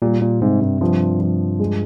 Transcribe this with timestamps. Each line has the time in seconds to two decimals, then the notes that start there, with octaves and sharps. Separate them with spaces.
0.02 A#2 G3
0.22 A#2
0.41 G#2 C3
0.61 G2
0.81 G2 F3
1.20 F3
1.60 G#3